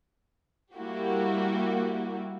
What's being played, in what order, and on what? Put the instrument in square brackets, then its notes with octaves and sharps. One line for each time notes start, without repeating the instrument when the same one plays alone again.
[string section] G3 A#3 E4 F#4 G4